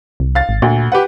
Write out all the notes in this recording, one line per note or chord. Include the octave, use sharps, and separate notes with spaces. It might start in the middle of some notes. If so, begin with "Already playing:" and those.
C2
F5 A6
G#1
D2 A#2
G4 B4 F#5